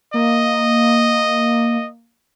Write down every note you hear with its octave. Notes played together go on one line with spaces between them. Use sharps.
A#3 D#5